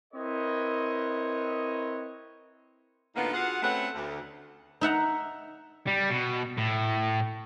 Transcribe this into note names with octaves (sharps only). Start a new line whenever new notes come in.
C4 E4 A#4 B4 C#5 D#5
A2 D3 A#3 B3 D#4 F4
F4 F#4 G#4 F5 F#5
A3 C4 C#4 B4 F#5
D2
D#4 E5 F#5 A#5
G3
B2
A2